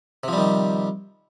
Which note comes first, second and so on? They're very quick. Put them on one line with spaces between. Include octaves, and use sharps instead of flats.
C3 F3 G3 D#3